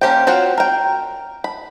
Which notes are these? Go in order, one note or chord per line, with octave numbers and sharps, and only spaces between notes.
A#3 C#4 G4 C5 G5
C4 F4 F#4 C5 C#5
A#4 G5
B5